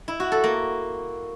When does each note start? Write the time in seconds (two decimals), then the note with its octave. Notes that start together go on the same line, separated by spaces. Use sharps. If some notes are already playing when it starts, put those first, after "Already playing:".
0.08 E4
0.20 F#4
0.32 A4
0.44 A#3